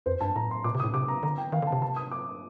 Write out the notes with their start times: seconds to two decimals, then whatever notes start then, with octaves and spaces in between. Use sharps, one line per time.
0.06 F2 C5
0.20 G2 A5
0.36 A2 A#5
0.51 C6
0.64 A#2 D6
0.75 C3
0.80 D#6
0.84 A2
0.94 C3 D6
1.08 A#5
1.23 D3 A#5
1.38 G5
1.52 D#3 F5
1.62 D3
1.67 A5
1.72 C3
1.82 A5
1.96 D#6
2.11 D6